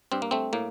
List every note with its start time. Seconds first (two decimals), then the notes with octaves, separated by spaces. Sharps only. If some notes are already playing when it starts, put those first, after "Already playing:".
0.12 G2 C4
0.22 A#3
0.31 A3 C4
0.53 A2 A#3